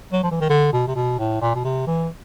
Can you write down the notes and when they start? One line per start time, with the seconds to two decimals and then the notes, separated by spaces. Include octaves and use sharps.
0.12 F#3
0.23 F3
0.31 E3
0.41 D#3
0.49 D3
0.73 B2
0.87 C3
0.96 B2
1.19 A2
1.41 A#2
1.55 B2
1.64 C3
1.87 E3